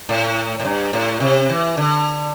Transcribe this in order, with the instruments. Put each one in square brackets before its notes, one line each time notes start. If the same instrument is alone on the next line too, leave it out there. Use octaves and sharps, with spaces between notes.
[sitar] A2
A2
G2
A2
C3
E3
D3